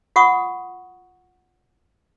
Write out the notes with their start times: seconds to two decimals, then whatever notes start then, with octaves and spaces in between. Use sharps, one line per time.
0.16 F4 F#5 C#6 D#6